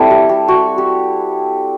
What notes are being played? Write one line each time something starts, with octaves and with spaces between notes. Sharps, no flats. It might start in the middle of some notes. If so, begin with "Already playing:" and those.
Already playing: G3 C4 E4 A4
G4
G4
F#4
G4